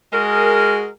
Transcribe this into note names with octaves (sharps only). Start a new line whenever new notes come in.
G#3 F#4 G#4 A#4